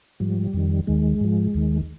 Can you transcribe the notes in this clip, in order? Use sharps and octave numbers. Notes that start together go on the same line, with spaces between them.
G#2 F3 G3
F2 D#3
D#2 D#3 G#3
G#2 F3
D#2 D#3